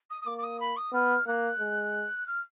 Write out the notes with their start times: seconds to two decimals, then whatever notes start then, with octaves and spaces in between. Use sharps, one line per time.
0.10 D#6
0.21 D#6
0.26 A#3 D6
0.38 D6
0.43 D#6
0.60 B5
0.76 D#6
0.93 B3 F6
1.26 A#3 F#6
1.59 G#3
2.26 F6